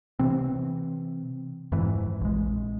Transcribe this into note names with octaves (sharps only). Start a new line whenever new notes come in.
C3 E3 C4
F2 G#2 E3
A#1 G#3